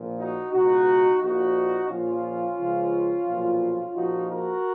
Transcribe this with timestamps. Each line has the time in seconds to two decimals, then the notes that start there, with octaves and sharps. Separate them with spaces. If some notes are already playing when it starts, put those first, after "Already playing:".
Already playing: A#1 A#2 F3
0.18 D#4 F#4
0.52 C#2 B2 D#4 F#4
1.21 A#1 A#2 F3 D#4 F#4
1.89 A#1 A#2 F3 C#4 F4
2.59 C#2 C#3 F3
3.27 B1 A#2 F3
3.95 A#1 A#2 F3 D#4 F#4
4.29 F#4 A#4